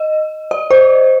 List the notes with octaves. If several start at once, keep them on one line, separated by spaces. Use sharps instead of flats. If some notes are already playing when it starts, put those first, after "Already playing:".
Already playing: D#5
D5
C5